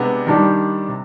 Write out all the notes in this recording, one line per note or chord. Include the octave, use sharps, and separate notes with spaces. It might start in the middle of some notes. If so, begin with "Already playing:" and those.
Already playing: C3 G#3 B3 D4
D#3 G3 D4 G4
C3